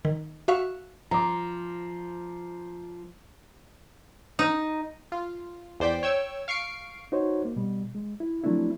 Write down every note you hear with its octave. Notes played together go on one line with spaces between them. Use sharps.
D#3
F#4 E5 F5 C#6
F3 A#5 D6
D#4
F4
E2 C5 D5 G5 B6
C#5 G5 E6 G#6
F5 C#6 C7 D7
D#4 F#4 C5 C#5
A#3
B2 G3
G#3
E4
F3 F#3 A3 C4 D4 E4